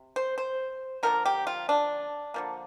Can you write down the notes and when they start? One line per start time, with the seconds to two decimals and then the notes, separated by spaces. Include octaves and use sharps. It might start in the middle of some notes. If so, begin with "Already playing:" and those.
Already playing: C3
0.16 C5
0.38 C5
1.03 D3 F3 A#3 A#4
1.26 G4
1.47 F4
1.69 D4
2.34 D3 F3 A#3